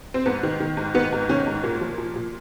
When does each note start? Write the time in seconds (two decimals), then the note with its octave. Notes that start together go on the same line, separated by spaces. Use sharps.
0.14 C4
0.26 G#2 B3
0.43 D#3
0.60 D#3
0.77 G#2
0.94 D#3 B3
1.12 G#2
1.29 D#3 C#4
1.47 G#2
1.63 A#2 A#3
1.81 F3
1.98 A#2
2.16 A#2